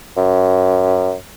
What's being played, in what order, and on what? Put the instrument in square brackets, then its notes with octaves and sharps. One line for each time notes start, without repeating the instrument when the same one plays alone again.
[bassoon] F#2